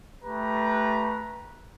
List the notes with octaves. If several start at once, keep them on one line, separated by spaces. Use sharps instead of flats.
A3 G4 B4 A#5